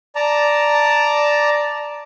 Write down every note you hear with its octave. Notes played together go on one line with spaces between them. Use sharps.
D5 A5 A#5